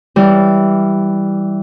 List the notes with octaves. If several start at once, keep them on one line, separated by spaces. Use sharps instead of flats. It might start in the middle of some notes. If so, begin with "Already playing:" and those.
E3 G3